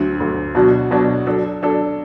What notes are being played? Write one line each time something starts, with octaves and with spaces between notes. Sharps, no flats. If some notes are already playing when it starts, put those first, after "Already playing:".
Already playing: D2 D3 F#3
D2 D3 F#3
B2 F#3 D4 F#4
B2 F#3 D4 F#4
F#3 D4 A4
F#3 D4 A4